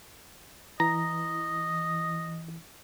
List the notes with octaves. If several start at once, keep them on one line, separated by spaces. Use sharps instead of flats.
E3 D#5 A#5